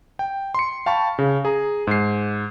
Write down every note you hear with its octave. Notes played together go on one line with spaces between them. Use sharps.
G5
C6 C#7
F5 G5 A5 B5 C#6
C#3
G#4 A#5
G#2 C7